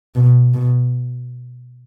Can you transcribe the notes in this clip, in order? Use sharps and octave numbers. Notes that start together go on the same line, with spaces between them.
B2
B2